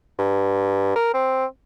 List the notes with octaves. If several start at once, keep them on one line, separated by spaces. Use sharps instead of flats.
G2
A#4
C4